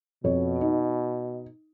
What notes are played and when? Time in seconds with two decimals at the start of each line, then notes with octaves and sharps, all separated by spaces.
0.24 F2 B2 C#5
0.61 D#4